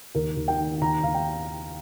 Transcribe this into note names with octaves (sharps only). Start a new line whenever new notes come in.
D#2 A#4
D#2
G5
D#3
D#2 A#5
D#2 F5
G5